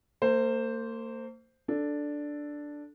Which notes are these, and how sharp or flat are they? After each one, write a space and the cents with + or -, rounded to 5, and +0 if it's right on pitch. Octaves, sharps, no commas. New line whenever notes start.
A#3 -40 C5 +0
D4 +0 A4 +0